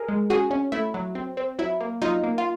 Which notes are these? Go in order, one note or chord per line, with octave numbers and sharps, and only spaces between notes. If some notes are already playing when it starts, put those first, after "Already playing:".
Already playing: G#4 A#4
G#3
C#4 F#4 G#4
C#4
A3 E4
F#3
C4
C4
F#3 E4
A#3
F#3 D#4 F4
A#3
F4